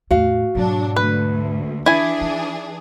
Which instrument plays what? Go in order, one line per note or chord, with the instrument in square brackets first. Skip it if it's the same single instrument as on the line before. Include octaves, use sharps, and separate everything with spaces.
[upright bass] E2 A2 [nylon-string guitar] F#4 F5
[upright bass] G#2 B2 [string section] F#3 D4
[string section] D2 [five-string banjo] B4
[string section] E3 D4 G#4 [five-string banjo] E4 G#5
[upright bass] D#4